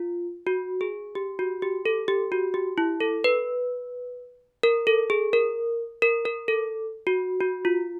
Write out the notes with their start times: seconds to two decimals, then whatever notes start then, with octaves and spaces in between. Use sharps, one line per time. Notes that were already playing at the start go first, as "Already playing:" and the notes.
Already playing: F4
0.47 F#4
0.81 G#4
1.15 G4
1.39 F#4
1.62 G4
1.85 A4
2.08 G4
2.32 F#4
2.54 G4
2.78 E4
3.00 A4
3.24 B4
4.63 A#4
4.87 A4
5.10 G#4
5.33 A#4
6.02 A#4
6.25 A#4
6.48 A4
7.07 F#4
7.40 F#4
7.65 F4